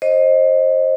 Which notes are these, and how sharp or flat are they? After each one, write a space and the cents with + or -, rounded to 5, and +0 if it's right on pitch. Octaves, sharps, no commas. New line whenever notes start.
C5 +25 D#5 +0